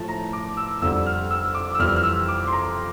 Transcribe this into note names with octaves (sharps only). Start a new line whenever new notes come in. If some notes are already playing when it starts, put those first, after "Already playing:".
Already playing: A2 F3 A5
A#5
D6
E6
F2 D3 G3 E6
F6
E6
D6
E6
F2 E3 G3 F6
F6
E6
D6
C6
A#5